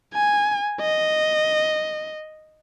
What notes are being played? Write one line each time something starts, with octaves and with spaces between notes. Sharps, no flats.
G#5
D#5